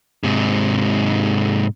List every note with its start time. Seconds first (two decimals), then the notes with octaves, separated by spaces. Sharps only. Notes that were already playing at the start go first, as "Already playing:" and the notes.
0.24 G#2 C3